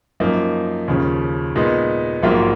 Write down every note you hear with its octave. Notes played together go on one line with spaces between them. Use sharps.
F#2 F3 A#3 D#4
D#2 C#3 F3
A#2 G#3 B3 D#4
A#1 G#2 F#3 A#3 F4